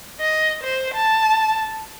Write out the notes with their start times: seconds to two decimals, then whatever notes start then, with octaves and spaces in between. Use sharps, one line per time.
0.20 D#5
0.63 C5
0.94 A5